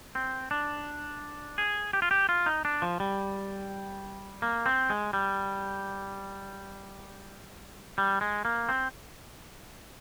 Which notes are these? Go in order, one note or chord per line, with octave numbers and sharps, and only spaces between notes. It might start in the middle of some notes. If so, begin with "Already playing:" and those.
C4
D4
G#4
G4
F4
G4
F4
D#4
D4
F3
G3
A#3
C4
G#3
G3
G3
G#3
A#3
C4